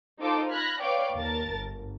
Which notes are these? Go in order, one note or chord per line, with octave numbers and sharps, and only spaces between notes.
D#4 F4 A4 C5 D6
B5 F6 F#6 G#6 A#6
B4 C#5 D5 F5 G5 D6
D#2 A#4 A5 A6
G1